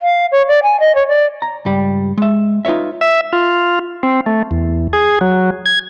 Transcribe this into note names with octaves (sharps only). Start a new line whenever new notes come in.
F5
C#5
D5
G#5
D#5
C#5
D5
A#5
C#2 G2 G3
G#3 E5
D#4 F4 B4 C#5 E5
E5
F4
C4
A3
E2
G#4
F#3
G#6